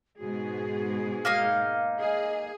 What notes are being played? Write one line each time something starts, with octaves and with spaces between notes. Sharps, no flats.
G#2 B2 F#4 G#4
A#3 D#4 F5
G#4 D#5